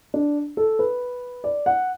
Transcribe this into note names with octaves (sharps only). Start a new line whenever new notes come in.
D4
A4
B4
D5
F#5